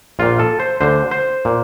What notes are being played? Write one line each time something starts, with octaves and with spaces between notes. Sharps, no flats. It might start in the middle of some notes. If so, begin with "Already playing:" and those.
A#1 A#2 F4
A4
C5
D2 D3 C5
C5
A#2